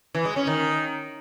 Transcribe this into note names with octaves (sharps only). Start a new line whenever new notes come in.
E3
G#3
C#4
D#3